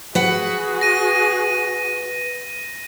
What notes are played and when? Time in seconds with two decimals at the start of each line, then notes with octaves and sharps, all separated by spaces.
0.15 F#4 G#4 B4 F#5
0.81 A#6 D#7